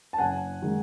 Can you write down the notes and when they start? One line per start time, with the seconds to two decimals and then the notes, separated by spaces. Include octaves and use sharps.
0.13 A5
0.18 F#1 F#5 G#5
0.62 D#3 G#3